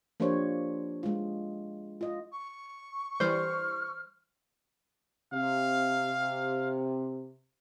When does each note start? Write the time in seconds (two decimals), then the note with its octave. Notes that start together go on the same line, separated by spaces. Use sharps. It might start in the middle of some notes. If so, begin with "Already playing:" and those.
0.20 F3 A#3 D4 G4 C5 C#5
1.03 G#3 F4
2.01 F4 D#5
2.32 C#6
3.20 E3 G3 C5 F6
5.33 C3 F5